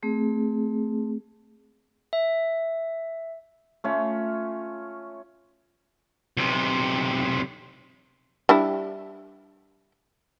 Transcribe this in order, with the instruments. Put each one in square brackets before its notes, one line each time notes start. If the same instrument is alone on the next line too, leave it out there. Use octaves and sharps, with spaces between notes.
[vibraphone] A3 C4 G#4
[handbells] E5
[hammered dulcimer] A3 C#4 F4
[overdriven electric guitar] B1 C3
[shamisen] G3 D4 E4